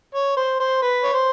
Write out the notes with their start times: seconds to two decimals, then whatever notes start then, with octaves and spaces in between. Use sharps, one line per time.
0.15 C#5
0.37 C5
0.60 C5
0.82 B4
1.04 C#5
1.13 C5